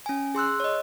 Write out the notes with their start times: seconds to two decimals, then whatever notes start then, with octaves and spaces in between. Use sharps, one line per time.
0.06 C#4 G#5
0.35 G#4 C6 E6 F#6
0.60 C#5 D#5